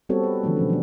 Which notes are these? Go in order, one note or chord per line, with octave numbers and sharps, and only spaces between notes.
G3 B3 C4 F#4 A4 C#5
B4
D3 E3 F3 A3
B2 F#3 C#4
F3 D4